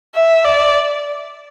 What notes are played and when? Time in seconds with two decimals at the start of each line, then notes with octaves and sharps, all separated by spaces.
0.15 E5
0.45 D5